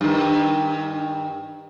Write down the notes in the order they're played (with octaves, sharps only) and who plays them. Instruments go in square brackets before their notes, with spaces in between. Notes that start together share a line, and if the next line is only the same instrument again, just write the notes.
[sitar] G2 D#3